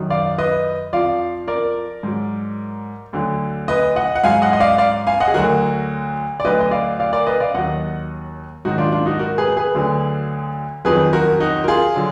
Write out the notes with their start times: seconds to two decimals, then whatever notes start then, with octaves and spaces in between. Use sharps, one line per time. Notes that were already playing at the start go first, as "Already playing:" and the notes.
Already playing: F#2 D#3 F#3
0.10 D5 F5
0.38 B4 D#5
0.93 F2 F3 D5 F5
1.48 A#4 D5
2.03 G#2 F#3
3.13 D2 D3 F#3
3.68 B4 D#5
3.96 D#5 F#5
4.15 F#5
4.24 G#2 F#3 F5 G#5
4.42 D#5 F#5
4.53 D#5
4.60 D5 F5
4.78 D5 F5
5.07 F5 G#5
5.20 D#5 F#5
5.28 G#4
5.34 D2 D3 F#3 F#4 A#4
6.40 D5
6.44 D2 D3 F#3 B4 D#5
6.60 D#5
6.71 D5 F5
7.00 D5 F5
7.13 A#4 D5
7.27 B4 D#5
7.40 D5 F5
7.54 D#2 D#3 F#3 D#5 F#5
8.65 G#2 D#3 F#3 D#4 F#4
8.78 D4 F4
8.92 D4 F4
9.06 D#4 F#4
9.19 F#4 A#4
9.38 G#4 B4
9.57 G#4 B4
9.75 D2 D3 F#3
10.85 F2 D#3 F#3 G#4 B4
11.13 F#4 A#4
11.40 D#4 F#4
11.64 A#4
11.68 F4 G#4
11.95 D3 F#3